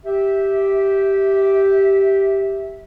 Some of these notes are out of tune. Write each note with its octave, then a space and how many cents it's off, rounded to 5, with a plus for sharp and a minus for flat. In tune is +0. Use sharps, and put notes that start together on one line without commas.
G4 -5 E5 -10